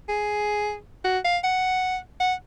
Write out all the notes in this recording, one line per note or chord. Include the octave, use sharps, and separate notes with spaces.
G#4
F#4
F5
F#5
F#5